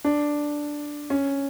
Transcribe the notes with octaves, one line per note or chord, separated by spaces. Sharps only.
D4
C#4